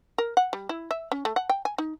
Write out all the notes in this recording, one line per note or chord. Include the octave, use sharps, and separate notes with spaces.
A#4
F#5
G3
E4
E5
C#4
A3
F#5
G5
G#5
D#4